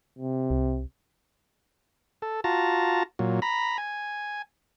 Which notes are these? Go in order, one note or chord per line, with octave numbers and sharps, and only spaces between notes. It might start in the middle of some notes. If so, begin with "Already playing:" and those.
C3
C2
A4
F4 F#4 A5 A#5
A#2 F#3
A#5 B5
G#5